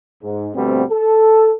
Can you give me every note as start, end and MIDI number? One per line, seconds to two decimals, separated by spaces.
0.23 0.49 44
0.55 0.83 38
0.55 0.83 47
0.55 0.83 55
0.55 0.83 57
0.55 0.83 59
0.55 0.83 60
0.91 1.53 69